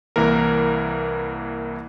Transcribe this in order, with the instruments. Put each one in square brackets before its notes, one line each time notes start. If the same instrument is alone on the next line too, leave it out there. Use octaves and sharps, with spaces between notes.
[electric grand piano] C2 E3 A#3 A#4